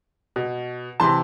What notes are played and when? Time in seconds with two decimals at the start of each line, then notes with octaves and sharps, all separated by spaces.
0.36 B2
1.00 C3 E3 A5 C6